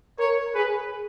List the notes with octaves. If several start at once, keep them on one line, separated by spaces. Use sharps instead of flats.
A#4 C#5
G#4 B4